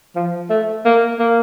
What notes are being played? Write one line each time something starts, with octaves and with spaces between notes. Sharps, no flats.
F3
A3
A#3
A#3